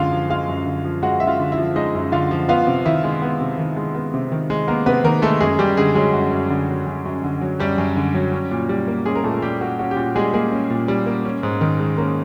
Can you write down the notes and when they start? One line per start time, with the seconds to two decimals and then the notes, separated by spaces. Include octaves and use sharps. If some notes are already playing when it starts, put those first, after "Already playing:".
Already playing: F#2 D3 G#3 F4 F5
0.12 F3
0.30 G#3 F4 F5
0.48 F#2
0.66 D3
0.84 F3
1.03 G#3 F#4 F#5
1.20 F#2 E5
1.27 F4 F5
1.40 D3
1.52 E4 E5
1.58 F3
1.76 G#3 D#4 D#5
1.95 F#2
2.12 D3 F4 F5
2.31 F3
2.49 B3 F4 F5
2.67 C3
2.85 D#3 E4 E5
3.04 G#3
3.22 B3
3.40 C3
3.59 D#3
3.76 G#3
3.95 B3
4.14 C3
4.32 D#3
4.50 G#3
4.68 A#3 B3 A#4
4.86 C3 B3 B4
5.04 D#3 A#3 A#4
5.22 G#3 A3 A4
5.40 F#2 G#3 G#4
5.59 F#2 G3 G4
5.77 D3 G#3 G#4
5.95 F#3 G#3 G#4
6.13 F#2 F#4
6.32 F#2
6.50 D3
6.68 F#3
6.86 F#2
7.05 F#2
7.24 D3
7.41 F#3
7.60 F#2 G3 G4
7.78 F#2
7.96 D3
8.14 F#3
8.33 C#4
8.51 A#2
8.69 G3
8.88 A#3
9.06 G#3 C#4 G#4
9.15 A#4
9.24 A#2 A3 A4
9.42 G3 G4
9.61 A#3 F#4
9.79 C#4 F#4
9.91 G4
9.96 A#2 F#4
10.15 G3 G#3 G#4
10.33 G#3 A#3 G#4
10.52 C#4
10.70 A#2
10.88 G3
11.07 A#3
11.25 C#4
11.43 G#2
11.61 D#3
11.80 G#3
11.97 A#3 C#4 A#4